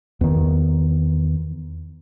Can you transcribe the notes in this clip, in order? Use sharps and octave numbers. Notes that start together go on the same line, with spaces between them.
E2 D#3